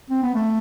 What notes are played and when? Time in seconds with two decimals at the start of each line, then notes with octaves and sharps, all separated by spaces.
0.10 C4
0.23 B3
0.35 A3